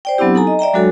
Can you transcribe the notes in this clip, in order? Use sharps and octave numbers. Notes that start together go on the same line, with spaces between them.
C5 D5 G5
F#3 B3 C4 D4 E4 G4
D#4 A4 G#5 A#5
D#5
D5 E5 G5 A#5
F#3 G#3 D4 F#4 A4 C#5